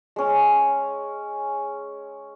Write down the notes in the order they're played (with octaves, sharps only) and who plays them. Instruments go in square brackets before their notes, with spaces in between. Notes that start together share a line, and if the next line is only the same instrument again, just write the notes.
[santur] G#3 C#4